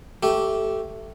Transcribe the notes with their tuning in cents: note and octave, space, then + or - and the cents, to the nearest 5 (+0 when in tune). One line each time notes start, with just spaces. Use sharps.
A3 +0 G4 -15